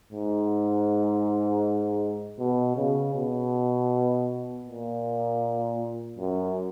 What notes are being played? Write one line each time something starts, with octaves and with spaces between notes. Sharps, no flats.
G#2
B2
C#3
B2
A#2
F#2